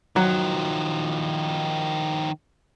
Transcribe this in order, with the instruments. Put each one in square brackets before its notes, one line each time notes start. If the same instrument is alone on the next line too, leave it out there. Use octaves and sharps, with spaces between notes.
[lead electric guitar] D#3 F3 [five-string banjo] F#3